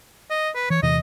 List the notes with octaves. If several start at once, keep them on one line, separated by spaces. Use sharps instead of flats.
D#5
B4
E3 C#5
E2 C3 E3 D#5